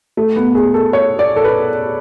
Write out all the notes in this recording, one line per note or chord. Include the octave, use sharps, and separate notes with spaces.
A3
B3
G#4
A4
C#5
D5
A4
B4